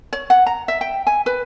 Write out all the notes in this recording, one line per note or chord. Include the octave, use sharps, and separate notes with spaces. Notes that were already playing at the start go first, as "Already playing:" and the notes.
C#5
F#5
A#5
E5
G5
G#5
B4